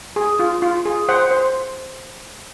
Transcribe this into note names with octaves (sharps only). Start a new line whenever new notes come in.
G#4
F4
F4
G#4
C5 F#5
C5